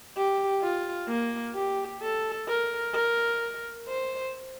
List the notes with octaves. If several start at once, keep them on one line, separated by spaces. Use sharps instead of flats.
G4
F4
A#3
G4
A4
A#4
A#4
C5